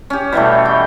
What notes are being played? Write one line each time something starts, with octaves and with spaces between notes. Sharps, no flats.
C#4 G4
B2 E3 G3 A3
G5